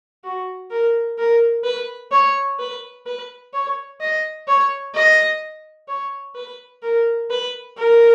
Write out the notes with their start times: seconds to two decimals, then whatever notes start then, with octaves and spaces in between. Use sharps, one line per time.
0.24 F#4
0.71 A#4
1.18 A#4
1.64 B4
2.12 C#5
2.59 B4
3.06 B4
3.53 C#5
4.00 D#5
4.47 C#5
4.95 D#5
5.88 C#5
6.35 B4
6.82 A#4
7.30 B4
7.77 A#4